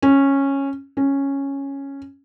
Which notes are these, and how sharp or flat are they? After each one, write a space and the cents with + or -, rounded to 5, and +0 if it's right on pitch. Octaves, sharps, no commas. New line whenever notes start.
C#4 -10
C#4 -5